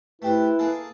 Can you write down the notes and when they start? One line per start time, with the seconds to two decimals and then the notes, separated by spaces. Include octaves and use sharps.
0.22 A3 E4 G4 B4 C5
0.59 A#3 G#4 A4